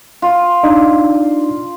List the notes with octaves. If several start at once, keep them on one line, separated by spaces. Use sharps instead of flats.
F4
D4 D#4 D5